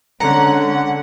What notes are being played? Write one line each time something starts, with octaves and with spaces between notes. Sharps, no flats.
D3 G#3 C#4 F#5 A#5